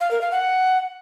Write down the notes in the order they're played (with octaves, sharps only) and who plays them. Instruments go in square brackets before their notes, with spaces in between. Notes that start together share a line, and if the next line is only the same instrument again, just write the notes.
[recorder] F5
A#4
F5
F#5